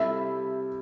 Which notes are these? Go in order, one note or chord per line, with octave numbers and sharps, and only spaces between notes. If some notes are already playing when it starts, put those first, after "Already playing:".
Already playing: C3 G3 E4 A4 E5